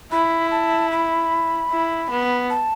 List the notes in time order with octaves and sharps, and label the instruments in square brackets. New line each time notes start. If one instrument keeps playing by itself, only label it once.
[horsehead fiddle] E4 [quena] B5
[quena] A5
B5
[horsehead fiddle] E4
B3
[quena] A5